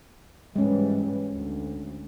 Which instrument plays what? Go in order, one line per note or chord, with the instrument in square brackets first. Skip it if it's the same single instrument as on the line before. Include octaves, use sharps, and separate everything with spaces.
[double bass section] G#2 E3 G3 [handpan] G#3 C#4
[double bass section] D2